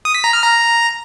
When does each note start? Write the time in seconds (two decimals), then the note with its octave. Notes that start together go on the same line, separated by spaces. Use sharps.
0.05 D#6
0.15 B6
0.24 A#5
0.33 F6
0.43 A#5